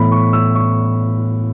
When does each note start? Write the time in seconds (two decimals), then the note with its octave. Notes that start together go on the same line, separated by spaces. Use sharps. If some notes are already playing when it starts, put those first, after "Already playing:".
Already playing: A2 E3 B3 B5
0.11 C#6
0.33 E6
0.55 C#6